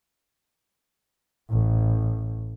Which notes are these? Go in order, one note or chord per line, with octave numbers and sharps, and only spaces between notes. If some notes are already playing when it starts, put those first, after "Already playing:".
A1